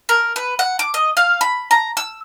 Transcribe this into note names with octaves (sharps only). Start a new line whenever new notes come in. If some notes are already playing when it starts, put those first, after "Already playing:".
A#4
B4
F#5
D6
D#5
F5
B5
A#5
E6